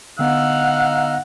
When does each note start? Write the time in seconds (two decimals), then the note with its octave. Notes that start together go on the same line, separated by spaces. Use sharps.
0.19 D3 B3 D#4 F5 F#5 E6